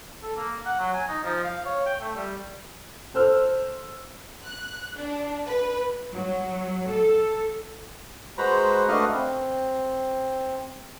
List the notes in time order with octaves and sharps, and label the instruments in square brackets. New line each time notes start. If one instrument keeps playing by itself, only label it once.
[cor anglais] A4
A#3
F#5
F#3
G#5
D#4
F3
F5
C#5
G5
A3
G3
[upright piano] A4 C5 E6 F6
[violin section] F#6
D4
B4
[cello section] F#3
A4
[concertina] G#3 F#4 B4 C5 A#5 B5
A3 D4 F#4 B4 D#5 F5
C4